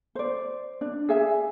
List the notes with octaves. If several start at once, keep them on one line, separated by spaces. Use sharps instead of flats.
C5 D5
D4
G#4 E5 G#5